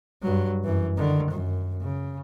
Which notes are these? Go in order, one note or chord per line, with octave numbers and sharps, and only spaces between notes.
G2 F#3
F#2 E3
D3 D#3
F#2
C#3